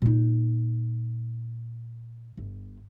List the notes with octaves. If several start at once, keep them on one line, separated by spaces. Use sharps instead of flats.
A#2 D#4
G1